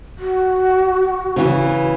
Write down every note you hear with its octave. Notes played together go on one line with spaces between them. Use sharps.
F#4
C#3 E3